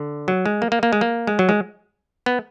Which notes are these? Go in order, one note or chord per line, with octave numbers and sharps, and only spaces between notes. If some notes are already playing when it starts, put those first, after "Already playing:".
Already playing: D3
F#3
G#3
A#3
A#3
A#3
G#3
A#3
G#3
F#3
G#3
B3